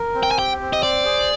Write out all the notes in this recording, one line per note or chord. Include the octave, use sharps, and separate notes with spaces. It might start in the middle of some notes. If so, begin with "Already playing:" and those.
Already playing: A#4
C4
G5
G#5
G4 G5
C4
D#5
C5 D5
G#4